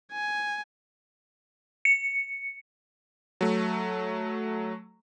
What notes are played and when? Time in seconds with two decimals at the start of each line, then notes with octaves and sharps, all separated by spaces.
0.12 G#5
1.85 C#7
3.41 F#3 A3